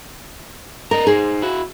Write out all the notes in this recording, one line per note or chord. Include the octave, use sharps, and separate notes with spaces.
A#4 D5 D#5 A#5
D#4 G#4 C5
E4 F#4